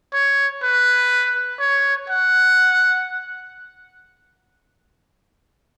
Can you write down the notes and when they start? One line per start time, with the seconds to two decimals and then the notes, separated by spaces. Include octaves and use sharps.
0.13 C#5
0.63 B4
1.60 C#5
2.10 F#5